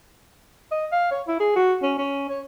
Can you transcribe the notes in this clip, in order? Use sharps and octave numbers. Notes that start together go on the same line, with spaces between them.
D#5
F5
C#5
E4
G#4
F#4
C#4
C#4
C#5